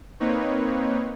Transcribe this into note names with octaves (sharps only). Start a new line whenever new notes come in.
A#3 C4 D#4 B4 C#5